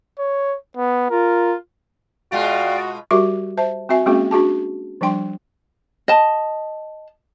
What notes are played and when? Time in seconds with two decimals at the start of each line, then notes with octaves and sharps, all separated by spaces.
0.19 C#5
0.77 B3
1.10 F4 A#4
2.32 B2 G#3 F4 F#4 D5 F5 G5
3.11 G3 F#4 G4 A#4 E5 D6
3.57 C5 E5 A5
3.89 C4 F#4 E5 G#5
4.06 G#3 A#3 C4 C#4 F#4 G#4
4.31 D4 F#4 G#4 A5
5.01 F3 G3 D4 G5 C6
6.08 D#5 A5